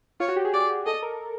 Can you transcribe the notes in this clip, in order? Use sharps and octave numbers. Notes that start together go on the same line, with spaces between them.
F4 C#5
F#4
G4
G#4
D5
A4 D#5
A#4